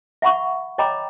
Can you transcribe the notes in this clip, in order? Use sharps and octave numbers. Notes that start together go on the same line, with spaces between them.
E5 F#5 B5 C#6
C#5 D#5 G5 A#5 B5 D6